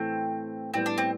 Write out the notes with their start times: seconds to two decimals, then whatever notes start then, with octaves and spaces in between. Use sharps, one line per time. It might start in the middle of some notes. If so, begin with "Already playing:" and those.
Already playing: A2 E3 A3 C4
0.74 A2 G3 B3 C4
0.86 D4
0.98 C4